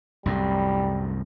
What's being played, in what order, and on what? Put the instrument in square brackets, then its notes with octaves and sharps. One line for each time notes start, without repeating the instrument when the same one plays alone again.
[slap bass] C2 F#2 A2 [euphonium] G3